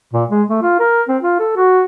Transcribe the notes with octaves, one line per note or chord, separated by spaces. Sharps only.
A#2
G#3
A3
F4
A#4
C4
F4
A4
F#4